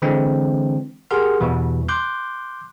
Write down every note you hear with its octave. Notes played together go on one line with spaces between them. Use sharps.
D3 E3 G#3 C4 D4
G4 G#4 A#4 F#5 C6 F6
E2 B2 E3 G3
C6 D6 F#6 G6